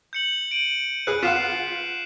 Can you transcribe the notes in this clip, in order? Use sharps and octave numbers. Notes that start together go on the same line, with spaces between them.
G6 C#7 F#7
D7 D#7 F#7
G#4 B4 F#6
F4 F5 F#5 B6 C7 E7